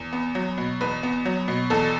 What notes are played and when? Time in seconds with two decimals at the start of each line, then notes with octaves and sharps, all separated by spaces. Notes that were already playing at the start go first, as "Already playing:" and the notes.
Already playing: E2
0.13 B3
0.35 F#3
0.58 B2
0.81 E2 B4
1.03 B3
1.25 F#3
1.48 B2
1.70 E2 A4